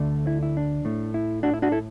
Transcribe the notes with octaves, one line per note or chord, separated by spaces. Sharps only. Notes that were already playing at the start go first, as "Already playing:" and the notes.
Already playing: D2 D3 A3
E4
E4
D4
A2 A3
E4
D4 F#4
E4
D4 F#4
E4 A4